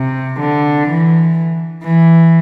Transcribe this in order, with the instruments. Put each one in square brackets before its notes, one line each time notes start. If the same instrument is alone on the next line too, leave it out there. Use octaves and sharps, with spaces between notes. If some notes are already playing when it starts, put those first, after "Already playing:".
Already playing: [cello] C3
D3
E3
E3